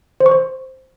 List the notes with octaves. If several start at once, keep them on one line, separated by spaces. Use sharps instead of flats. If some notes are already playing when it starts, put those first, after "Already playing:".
C5
C#6
C5